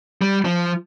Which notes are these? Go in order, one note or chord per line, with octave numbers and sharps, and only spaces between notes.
G3
F3